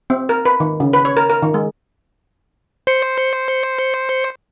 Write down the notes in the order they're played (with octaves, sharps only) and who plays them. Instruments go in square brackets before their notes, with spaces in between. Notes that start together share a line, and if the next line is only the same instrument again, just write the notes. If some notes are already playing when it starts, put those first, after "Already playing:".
[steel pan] C4
A#4
B4
D#3
C#3
B4
C#5
A#4
A#4
D#3
G#3
[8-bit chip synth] C5 C#7